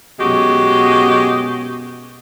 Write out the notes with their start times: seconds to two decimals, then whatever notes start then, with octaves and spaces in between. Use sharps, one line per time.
0.20 F#2 B2 G#3 F#4 G4